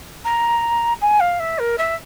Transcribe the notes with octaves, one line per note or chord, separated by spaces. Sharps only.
A#5
G#5
F5
E5
A#4
E5